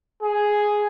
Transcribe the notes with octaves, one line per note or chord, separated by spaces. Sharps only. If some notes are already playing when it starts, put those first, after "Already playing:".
G#4